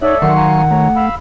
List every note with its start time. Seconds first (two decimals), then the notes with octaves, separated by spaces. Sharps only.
0.02 D#4 A4 C#5 D5 E5 F#5
0.22 D#3 F#3 F#5 C6 C#6
0.37 F5 G#5 A#5
0.71 A3 C#5 A#5
0.96 F5 B5 E6